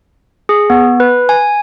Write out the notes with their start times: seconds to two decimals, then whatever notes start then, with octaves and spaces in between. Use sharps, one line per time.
0.49 G#4
0.70 B3
1.00 B4
1.29 G#5